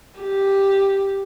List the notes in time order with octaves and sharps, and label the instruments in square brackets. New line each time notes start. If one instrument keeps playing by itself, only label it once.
[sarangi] G4